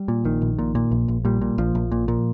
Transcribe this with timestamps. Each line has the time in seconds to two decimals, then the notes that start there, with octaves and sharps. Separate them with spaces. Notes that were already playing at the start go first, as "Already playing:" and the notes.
Already playing: G3
0.08 A#2
0.24 A#1 D#3
0.42 A#1
0.59 A#2
0.75 A#2
0.91 A#1
1.08 A#1
1.25 A#2 G3
1.41 A#2
1.58 A#1 F3
1.75 A#1
1.92 A#2
2.08 A#2